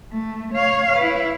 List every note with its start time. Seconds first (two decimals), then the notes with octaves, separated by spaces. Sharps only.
0.11 A3
0.54 C#5 F5
0.97 E4 B4